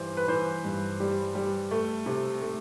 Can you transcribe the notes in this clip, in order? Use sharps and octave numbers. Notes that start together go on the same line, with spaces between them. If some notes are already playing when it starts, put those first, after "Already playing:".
Already playing: G2 E3 G3 C5
B4
E3 C5
G2
G3
G3
A3
C3
A3